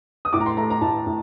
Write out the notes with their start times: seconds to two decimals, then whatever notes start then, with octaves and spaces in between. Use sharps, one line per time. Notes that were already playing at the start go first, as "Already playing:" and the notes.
0.25 D#6
0.33 A2 D6
0.40 A#5
0.46 C6
0.57 A3 A#5
0.70 A#5
0.81 A2 A5
1.06 A2